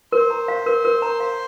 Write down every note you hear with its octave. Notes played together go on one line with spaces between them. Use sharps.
A#4 C5
A#5
F5
A#4
A#4
A#5
F5